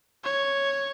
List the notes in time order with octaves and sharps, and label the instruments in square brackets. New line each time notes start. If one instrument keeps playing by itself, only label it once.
[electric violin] C#5